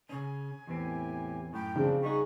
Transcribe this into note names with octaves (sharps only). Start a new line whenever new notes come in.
C#3 C#4 G#5
E2 A2 E3 C4 G4
F#2 A2 G5
C#3 F3 C4 D4
G3 D#4 F#4 G#4 C#6